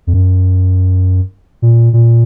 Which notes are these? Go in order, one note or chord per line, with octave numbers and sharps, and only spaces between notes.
F2
F#2
A#2
A#2